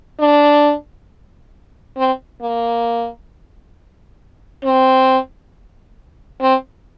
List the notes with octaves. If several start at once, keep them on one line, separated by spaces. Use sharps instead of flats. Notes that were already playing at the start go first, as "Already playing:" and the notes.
D4
C4
A#3
C4
C4